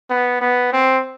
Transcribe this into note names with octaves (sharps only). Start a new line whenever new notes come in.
B3
B3
C4